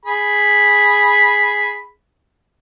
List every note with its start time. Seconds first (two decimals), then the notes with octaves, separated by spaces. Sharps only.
0.05 G#4 B5